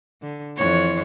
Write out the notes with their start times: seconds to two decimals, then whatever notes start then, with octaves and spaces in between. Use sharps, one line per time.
0.22 D3
0.57 F2 E3 C#5